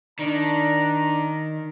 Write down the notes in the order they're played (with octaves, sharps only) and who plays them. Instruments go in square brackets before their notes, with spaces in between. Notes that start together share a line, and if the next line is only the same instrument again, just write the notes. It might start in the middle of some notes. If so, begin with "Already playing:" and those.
[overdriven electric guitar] D#3 [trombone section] D4 [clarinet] A#5